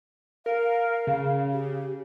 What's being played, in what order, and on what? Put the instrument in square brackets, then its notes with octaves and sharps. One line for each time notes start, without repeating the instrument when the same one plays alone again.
[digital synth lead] A#4 [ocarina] F5
[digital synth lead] C#3
[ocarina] G4